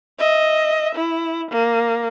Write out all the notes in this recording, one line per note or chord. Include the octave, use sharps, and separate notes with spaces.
D#5 E5
E4
A#3